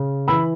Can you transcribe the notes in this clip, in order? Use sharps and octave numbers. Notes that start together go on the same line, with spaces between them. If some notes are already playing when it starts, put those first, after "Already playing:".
Already playing: C#3
E3 B5 E6